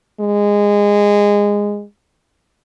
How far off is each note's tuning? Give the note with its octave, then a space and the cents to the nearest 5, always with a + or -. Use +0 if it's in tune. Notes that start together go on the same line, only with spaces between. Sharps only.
G#3 -20